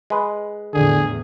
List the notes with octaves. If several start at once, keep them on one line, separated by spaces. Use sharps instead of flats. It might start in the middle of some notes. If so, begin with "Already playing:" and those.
G#3 B4
E2 A2 D3 E3 G#4